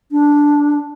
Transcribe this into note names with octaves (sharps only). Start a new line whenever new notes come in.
D4